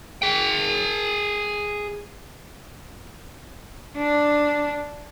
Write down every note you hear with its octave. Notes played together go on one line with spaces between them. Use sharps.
G#4 G5
D4